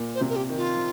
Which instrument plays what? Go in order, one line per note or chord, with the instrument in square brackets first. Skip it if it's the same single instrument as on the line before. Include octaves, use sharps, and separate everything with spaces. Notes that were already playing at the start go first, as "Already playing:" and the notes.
Already playing: [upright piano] A#2
[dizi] C5
[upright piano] C3
[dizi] A#4
G4
[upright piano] D#3
[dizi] F4
[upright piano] F3